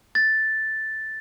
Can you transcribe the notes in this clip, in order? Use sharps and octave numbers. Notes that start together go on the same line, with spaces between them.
A6